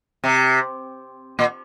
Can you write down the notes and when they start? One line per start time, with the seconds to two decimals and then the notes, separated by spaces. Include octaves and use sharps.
0.24 C3
1.39 A#2